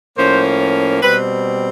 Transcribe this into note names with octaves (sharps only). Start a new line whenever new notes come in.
A2 F3 A#3 C#4 C5
B2 G3 C4 B4